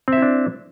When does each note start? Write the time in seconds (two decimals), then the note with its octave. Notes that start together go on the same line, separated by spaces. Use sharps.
0.08 C4
0.13 E5
0.17 E4
0.22 D4